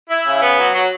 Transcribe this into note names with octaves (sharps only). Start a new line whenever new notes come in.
E4
C#3
B3
F#3
F#3